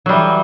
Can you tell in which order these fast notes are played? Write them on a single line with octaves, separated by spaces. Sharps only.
F#3 G3 E3